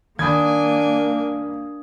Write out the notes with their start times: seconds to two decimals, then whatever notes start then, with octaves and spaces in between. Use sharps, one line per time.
0.19 D#3 A#3 D4 G#5 B5 D#6 G#6